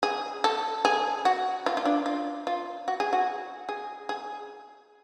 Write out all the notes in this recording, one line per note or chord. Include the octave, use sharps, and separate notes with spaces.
G#4
A4
G#4
F#4
F4
F4
D4
F4
F4
F#4
G#4
F#4
G#4
G#4